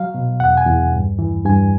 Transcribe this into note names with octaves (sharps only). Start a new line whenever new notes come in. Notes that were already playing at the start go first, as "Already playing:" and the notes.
Already playing: F#3 F5
B2
E2 F#5
G#5
E2
G2
E3
G2 G#5